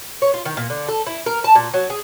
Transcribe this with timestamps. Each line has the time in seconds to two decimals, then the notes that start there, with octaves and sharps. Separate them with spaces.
0.22 C#5
0.34 F4
0.45 D#3
0.57 A#2
0.70 D3
0.89 A4
1.07 E4
1.26 A#4
1.44 A5
1.55 A#2
1.74 F#3
1.90 G#4